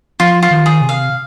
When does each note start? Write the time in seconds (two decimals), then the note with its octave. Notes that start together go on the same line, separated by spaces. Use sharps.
0.20 F3 F4
0.43 F4
0.51 D#3
0.66 G#4
0.81 C3
0.89 F5